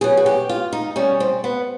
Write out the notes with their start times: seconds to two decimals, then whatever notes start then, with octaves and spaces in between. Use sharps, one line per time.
0.01 B2 F#3 G#4
0.17 F#4
0.26 G4
0.49 F4
0.73 D#4
0.96 B2 G3 C#4
1.20 C4
1.44 B3